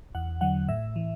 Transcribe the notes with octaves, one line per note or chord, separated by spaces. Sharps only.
E2 F#5
D3 F#3 F#5
A2 E5
E3